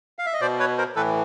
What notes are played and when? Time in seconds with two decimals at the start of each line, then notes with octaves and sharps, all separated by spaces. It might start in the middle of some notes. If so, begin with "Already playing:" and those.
0.19 F5
0.26 E5
0.34 D#5
0.41 B2 C5 D5
0.59 B4 C#5
0.78 A#4 C5
0.96 A2 E3 A4 B4